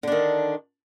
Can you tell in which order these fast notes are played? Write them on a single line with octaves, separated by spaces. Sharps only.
D3 D4 D#3